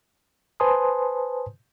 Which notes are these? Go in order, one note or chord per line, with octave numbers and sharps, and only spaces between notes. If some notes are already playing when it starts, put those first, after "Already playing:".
B4 C5 G#5 A5 C6 D#6